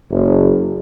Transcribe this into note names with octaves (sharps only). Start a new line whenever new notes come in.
F#1